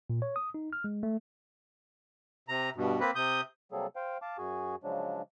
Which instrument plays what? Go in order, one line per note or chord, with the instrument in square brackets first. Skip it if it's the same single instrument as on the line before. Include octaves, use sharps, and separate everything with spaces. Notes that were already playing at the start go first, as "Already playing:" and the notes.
[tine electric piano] A#2
C#5
D#6
D#4
F6
G#3
A3
[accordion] C3 A#5
G2 B2
A#3 C4 B4
C3 D#6 G6
C3 F#3 G3 A#3 G#4 A4
C5 F5 G5
F5 A5 D6
F#2 F#4 G#4 G#5
C#3 F3 F#3 G#3 D4